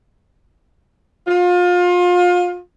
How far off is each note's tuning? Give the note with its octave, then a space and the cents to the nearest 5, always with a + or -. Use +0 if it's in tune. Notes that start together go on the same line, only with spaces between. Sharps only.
F4 +30